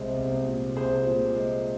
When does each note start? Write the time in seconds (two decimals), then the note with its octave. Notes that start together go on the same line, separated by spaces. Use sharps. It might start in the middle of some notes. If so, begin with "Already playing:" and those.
Already playing: C2 G#3 G#4 C5
0.16 C2
0.46 A#2
0.76 C2 G#4 C5
1.06 A#2
1.35 G#3